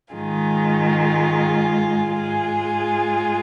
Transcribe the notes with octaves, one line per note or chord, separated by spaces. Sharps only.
G#2 D#3 G#3 F4 G#4
G#2 G#3 F4 G#4